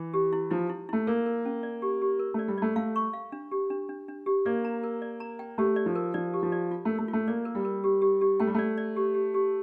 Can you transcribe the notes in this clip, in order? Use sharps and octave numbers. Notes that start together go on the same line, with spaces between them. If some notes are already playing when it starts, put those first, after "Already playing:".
Already playing: E3
G4
E4
F3 E4
E4
A3 E4
A#3 A#4
A#4
C#4
D5
G4
G4
A#4
A3 D5
G3
A3 D5
A3 F5
C#6
F5
D4
G4
D4
D4
D4
G4
A#3 D5
A#5
A#4
D5
A#5
G5
A3 G4
D5
F3
A#4
F3 D5
G4
F3
D5
F4
A3 A#4
A3
F4
A3
A#3 D5
A#4
G3
A#4
G4
G4
G4
A3 G5
G3
A3 D5
D5
G4
G4
G4